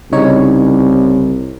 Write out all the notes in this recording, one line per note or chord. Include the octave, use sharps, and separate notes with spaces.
C2 C#3 D#4 C#5